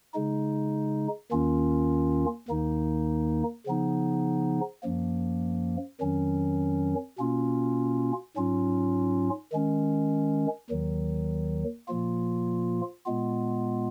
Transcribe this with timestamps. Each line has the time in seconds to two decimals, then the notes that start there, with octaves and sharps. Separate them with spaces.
0.14 C#3 G#3 D#4
1.31 D#2 D#3 A#3 C#4 F4
2.48 D#2 D#3 A#3 D#4
3.66 C#3 F3 B3 D#4
4.83 F#2 F3 A#3
6.00 F2 D#3 F#3 C#4
7.18 B2 A#3 C#4 F4
8.36 G#2 F#3 C#4 F4
9.53 D#3 G#3 C#4
10.70 D#2 D#3 F#3
11.88 A#2 F3 A#3 F4
13.06 A#2 G#3 B3 F4